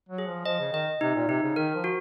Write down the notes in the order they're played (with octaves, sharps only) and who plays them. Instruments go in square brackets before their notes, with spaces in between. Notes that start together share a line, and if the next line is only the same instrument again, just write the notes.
[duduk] F#3
[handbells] G#4
[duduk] F3
[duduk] F3 [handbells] D#5
[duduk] C#3
[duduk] D#3 [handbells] D#5
[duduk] C3 [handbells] D#4
[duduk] A#2
[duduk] C3 [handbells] D#4
[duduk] C#3
[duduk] D#3 [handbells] A#4
[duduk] F3
[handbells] F#4